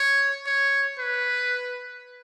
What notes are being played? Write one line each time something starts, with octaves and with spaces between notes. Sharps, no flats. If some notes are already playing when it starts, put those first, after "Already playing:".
Already playing: C#5
C#5
B4